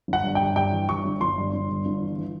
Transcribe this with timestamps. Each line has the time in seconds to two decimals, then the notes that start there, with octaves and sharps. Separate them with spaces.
0.08 G1 F#5
0.24 G2
0.35 G2 G5
0.56 G2 G5
0.72 E3
0.89 G2 C#6
1.05 G1
1.21 G1 C6
1.38 G2
1.53 G1
1.70 G2
1.86 G1
2.02 E3
2.18 E3